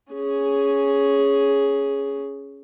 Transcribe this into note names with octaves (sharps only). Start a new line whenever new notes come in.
C#4 G#4